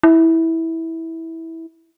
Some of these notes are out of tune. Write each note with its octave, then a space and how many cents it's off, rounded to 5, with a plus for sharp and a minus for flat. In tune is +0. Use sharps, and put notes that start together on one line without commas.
E4 -15